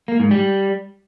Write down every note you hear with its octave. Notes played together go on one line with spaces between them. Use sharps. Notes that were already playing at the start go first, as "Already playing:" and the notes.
A#3
G#2
G3